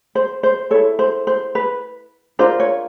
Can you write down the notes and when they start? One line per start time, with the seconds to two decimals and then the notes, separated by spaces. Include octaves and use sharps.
0.15 C5
0.43 C5
0.71 E4 A4 C#5
0.99 C5
1.27 C5
1.55 B4
2.39 D4 F4 A#4 C5
2.60 C#5